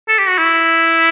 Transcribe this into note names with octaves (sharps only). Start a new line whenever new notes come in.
A4
G4
F#4
E4